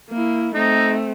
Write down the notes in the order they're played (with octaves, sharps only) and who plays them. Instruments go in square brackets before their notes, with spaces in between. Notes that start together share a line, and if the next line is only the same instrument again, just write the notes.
[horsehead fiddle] A#3 E4
[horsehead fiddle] A3 C4 [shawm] D#4